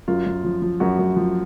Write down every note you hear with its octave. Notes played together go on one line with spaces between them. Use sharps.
F#2 F4
F#2
F3
F3
F#2 F#4
F#2
F3